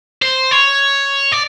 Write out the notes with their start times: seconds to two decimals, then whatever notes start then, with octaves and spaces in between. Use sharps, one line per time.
0.22 C5
0.52 C#5
1.32 D5